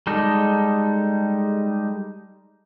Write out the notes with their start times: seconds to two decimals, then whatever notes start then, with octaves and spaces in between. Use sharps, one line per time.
0.07 G3 G#3 D#4 A4